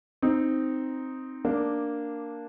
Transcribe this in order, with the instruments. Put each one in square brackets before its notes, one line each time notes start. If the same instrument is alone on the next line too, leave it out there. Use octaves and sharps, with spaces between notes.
[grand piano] C4 D#4
A#3 D4